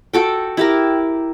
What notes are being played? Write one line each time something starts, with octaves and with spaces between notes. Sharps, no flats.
F#4 A4 G5
E4 G4 A#4